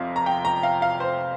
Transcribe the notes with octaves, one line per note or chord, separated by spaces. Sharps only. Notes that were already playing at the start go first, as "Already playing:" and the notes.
Already playing: F2 C3 F5
A#5
G5
A#5
F5
F5
C5